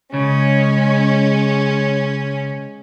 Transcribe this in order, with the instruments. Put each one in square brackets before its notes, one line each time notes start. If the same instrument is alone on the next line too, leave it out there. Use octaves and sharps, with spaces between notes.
[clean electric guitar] C#3 [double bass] G#3 [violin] C#4 [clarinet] C#5